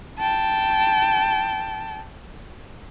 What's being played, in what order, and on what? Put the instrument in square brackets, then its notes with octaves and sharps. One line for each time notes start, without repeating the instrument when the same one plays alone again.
[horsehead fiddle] G5 A5